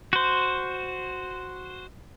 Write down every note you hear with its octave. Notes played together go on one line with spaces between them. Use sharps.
F#4 C5